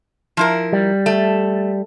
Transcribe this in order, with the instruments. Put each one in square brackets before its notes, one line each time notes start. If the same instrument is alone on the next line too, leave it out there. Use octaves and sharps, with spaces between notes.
[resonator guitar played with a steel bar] F3 E4 A#4
[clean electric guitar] G3
[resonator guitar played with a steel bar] A3